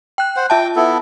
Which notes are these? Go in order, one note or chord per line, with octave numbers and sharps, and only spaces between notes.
G5 F#6
C5 F#5
F4 E5 G5 A5
B3 E4 A4